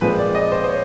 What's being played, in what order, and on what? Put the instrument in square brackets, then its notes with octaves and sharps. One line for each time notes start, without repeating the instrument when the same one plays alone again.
[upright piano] A#2 F3 G#3 C4 B4
D5
D#5
C5
C5
C#5